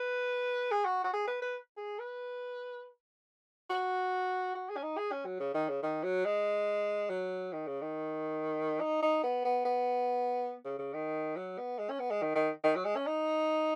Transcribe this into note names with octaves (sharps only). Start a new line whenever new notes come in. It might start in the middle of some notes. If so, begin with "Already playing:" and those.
Already playing: B4
G#4
F#4
F#4
G#4
B4
B4
G#4
B4
F#4
F#4
G#4
C#4
D#4
G#4
C#4
F#3
C#3
D#3
C#3
D#3
F#3
G#3
F#3
D#3
C#3
D#3
D#4
D#4
B3
B3
B3
C#3
C#3
D#3
F#3
B3
G#3
C#4
B3
G#3
D#3
D#3
D#3
F#3
G#3
C#4
D#4